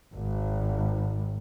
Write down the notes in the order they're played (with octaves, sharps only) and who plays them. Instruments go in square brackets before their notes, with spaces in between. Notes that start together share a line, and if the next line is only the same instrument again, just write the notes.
[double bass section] G#1